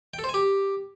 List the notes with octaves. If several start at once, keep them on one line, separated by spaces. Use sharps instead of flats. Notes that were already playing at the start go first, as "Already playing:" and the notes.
G5
A4
C5
G#5
G4